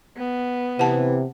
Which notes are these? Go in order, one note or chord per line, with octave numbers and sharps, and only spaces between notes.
B3
C3 E3 F#5 A5